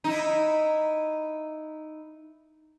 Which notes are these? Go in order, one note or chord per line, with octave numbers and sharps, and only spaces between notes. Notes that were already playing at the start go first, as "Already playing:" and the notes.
D#4 E4